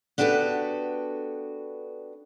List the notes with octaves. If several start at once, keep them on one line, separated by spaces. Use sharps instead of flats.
B3 D4 F#4 G4 A4 B4